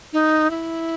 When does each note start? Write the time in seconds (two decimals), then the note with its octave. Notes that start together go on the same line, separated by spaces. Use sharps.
0.13 D#4
0.50 E4